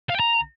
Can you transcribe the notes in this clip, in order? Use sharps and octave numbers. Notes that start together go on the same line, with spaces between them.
F5
G5
A#5